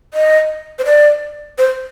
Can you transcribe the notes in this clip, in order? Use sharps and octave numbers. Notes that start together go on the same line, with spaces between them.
D#5
C5
D5
C5